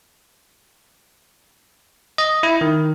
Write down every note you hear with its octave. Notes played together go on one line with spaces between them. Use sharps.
D#5
E4
D#3